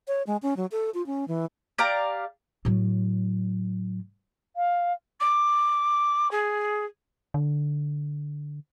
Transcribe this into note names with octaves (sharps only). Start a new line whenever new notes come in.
C#5
G#3
C#4
F#3
A4
F4
C#4
E3
G4 D5 F5 A#5
A2 F#3
F5
D6
G#4
D3